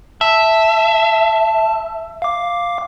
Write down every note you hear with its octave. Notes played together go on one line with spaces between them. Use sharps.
E5 A5
F5 D6